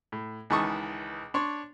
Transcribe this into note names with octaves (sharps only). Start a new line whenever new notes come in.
A2
C#2 D#3 E3 A5 C#6 D#6
D4 C#5 C6